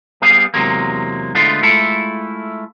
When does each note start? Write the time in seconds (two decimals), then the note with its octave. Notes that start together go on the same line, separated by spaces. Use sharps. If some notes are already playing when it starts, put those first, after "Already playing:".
0.22 G3 B3 G#4 F5
0.54 E2 C3 F#3 G#3 A#3
1.35 D3 G#3 A3 B3 D4 F4
1.63 G#3 A3 E4 F4 A4